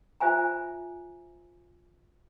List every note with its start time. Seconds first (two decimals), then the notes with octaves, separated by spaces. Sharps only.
0.20 F4 C5 E5 G#5 A#5